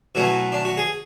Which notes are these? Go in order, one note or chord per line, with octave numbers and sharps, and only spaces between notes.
B2 F#3 A3 C#4 E4
D4
F#4
G#4